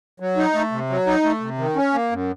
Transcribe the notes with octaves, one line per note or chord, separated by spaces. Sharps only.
F#3
D#4
A3
C3
F#3
D#4
A3
C3
D#3
C#4
A#3
F#2